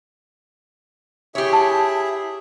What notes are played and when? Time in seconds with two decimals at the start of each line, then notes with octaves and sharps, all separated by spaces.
1.35 E4 G4 G#4 C#5 E5
1.53 A5